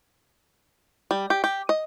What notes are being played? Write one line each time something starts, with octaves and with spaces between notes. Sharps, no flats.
G3
G4
G4
D#5